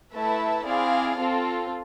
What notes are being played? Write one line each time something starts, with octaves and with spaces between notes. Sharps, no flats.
A3 E4 B4 E5 A5
C4 E4 G#4 D5 F5
C4 F4 A4